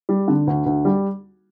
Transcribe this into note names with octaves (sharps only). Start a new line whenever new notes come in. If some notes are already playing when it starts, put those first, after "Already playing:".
G3
D3
D2
D2
G3